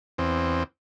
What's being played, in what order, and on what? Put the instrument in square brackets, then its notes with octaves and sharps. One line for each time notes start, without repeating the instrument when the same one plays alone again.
[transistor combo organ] E2 C4